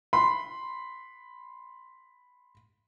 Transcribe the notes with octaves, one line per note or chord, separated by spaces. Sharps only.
B5 C6